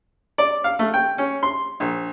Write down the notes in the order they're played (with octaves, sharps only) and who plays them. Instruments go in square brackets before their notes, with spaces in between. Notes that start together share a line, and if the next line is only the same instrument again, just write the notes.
[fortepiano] D5
F5
A3
G5
C#4
C6
A#1